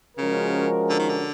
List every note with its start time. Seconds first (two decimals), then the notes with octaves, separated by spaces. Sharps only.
0.18 C#3 F3 G#3 C#4 F#4 A#4
0.89 D3
0.99 D#3
1.09 D3